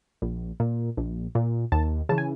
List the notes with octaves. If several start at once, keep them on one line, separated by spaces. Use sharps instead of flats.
A#1
A#2
A#1
A#2
D#2 A5
C#3 E3 A5
G#5